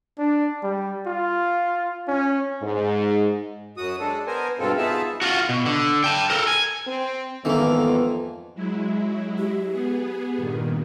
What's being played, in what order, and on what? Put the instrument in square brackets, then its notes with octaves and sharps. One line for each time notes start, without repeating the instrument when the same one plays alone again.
[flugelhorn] D4
G3
F4
C#4
[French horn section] G#2
[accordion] F#2 F#4 D#6
G#3 D4 A4
B3 A#4 C5 G#5
G2 B2 G#3 C4 F4 A4
B3 D#4 F4 G#4 E5 A5
[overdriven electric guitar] F4 F#4
B2
D3
G5 A5
A4 A#4
G#5
[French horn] C4
[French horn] F2 [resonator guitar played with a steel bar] G#2 D#3 A4 [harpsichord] E3 A#3 [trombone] B3
[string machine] F#3 G#3 E4
[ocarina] G4
[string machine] B3 G#4
G2 A#2 D#3